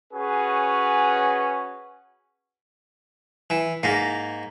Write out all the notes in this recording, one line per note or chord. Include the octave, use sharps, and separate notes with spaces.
C#4 F#4 G#4 B4
E3
G#2 A#3